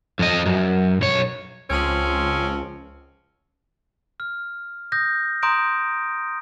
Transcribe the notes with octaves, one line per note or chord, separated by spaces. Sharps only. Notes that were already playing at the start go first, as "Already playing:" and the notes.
F2 D#5
F#2
B1 C#5
C#2 F3 C4 C#4
F6
D#6 G6 A#6
A#5 C6 D#6 G6 D7